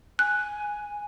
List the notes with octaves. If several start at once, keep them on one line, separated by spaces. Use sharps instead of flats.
G#5 F#6